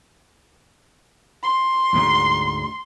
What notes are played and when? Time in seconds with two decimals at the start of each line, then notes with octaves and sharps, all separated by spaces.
1.43 C6
1.93 D2 G#2